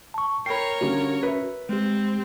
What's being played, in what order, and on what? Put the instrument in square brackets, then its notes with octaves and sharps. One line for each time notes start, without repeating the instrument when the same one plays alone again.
[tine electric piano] A5 C#6
[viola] A#4 C#5 [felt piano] G5 B5 [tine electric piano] C7
[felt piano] D3 G3 A#3 [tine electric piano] C#4 F#4
[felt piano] B4 E5
[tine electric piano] G#3 G4 [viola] C4